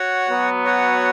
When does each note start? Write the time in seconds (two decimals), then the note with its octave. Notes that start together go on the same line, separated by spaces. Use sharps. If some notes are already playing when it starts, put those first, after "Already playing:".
Already playing: F#4 C#5 F#5
0.29 F#3 B3
0.64 F#4 C#5 F#5